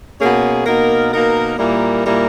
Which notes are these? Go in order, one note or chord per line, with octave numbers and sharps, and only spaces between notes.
B2 A#3 C#4 G#4
B2 A#3 D#4 A#4
B2 A#3 D#4 A#4
A#2 G3 A#3 E4 A#4
A#2 G3 A#3 E4 A#4